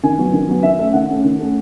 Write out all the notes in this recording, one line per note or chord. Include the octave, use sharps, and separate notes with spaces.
D#3 G#5
F#3 B3
D#3
F#3 B3
D#3 E5
A3 C#4 E5
D#3 F#5
A3 C#4
D#3
A3 C#4